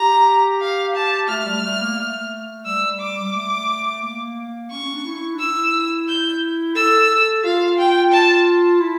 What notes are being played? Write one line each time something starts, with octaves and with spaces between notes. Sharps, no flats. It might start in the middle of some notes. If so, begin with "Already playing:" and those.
Already playing: G4 A#5
F5
A5
A3 F6
G3
A3
A#3
A3
G3 E6
D6
G3
A3
A#3
C#4 C#6
C#4
D4
E4
D4
E4 E6
G6
A4 E6
A4
F4 F5
G5
A5
E4